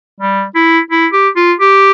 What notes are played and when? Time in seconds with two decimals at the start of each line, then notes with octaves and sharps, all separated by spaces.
0.20 G3
0.55 E4
0.91 E4
1.13 G4
1.36 F4
1.59 G4